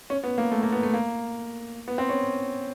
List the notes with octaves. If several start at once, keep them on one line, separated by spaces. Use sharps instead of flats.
C#4
B3
A#3
A3
A#3
B3
A3
A#3
B3
C4
C#4